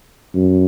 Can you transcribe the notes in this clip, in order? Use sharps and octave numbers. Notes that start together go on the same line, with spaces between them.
F#2